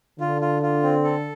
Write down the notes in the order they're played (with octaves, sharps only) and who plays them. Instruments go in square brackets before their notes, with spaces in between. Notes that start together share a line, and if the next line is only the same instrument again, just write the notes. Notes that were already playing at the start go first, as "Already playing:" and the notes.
[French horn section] D3 [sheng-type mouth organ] F4
[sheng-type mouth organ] F4
F4
C4
A4